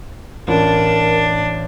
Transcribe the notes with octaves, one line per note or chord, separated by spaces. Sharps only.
A1 D4 A#4